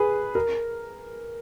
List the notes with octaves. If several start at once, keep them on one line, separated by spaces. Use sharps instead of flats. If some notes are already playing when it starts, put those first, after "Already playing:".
Already playing: G#4 B4
A#4